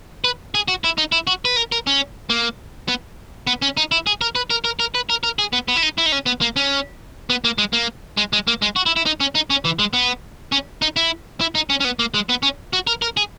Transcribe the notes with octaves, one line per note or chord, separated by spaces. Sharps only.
B4
G#4
F#4
E4
D#4
E4
F#4
B4
A#4
A#4
C#4
A#3
B3
B3
C#4
D#4
E4
G#4
A#4
B4
A#4
A#4
A#4
B4
A#4
A#4
G#4
B3
B3
E4
D#4
E4
D#4
C#4
B3
A#3
C#4
B3
A#3
G#3
A#3
G#3
G#3
A#3
G#3
F#4
E4
E4
D#4
C#4
D#4
C#4
E3
G#3
B3
C#4
D#4
E4
E4
D#4
C#4
C#4
B3
A#3
G#3
B3
C#4
F#4
A#4
A#4
G#4